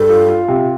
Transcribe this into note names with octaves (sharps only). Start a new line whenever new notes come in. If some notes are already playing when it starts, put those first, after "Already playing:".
Already playing: G2 A4
F4
F4
C3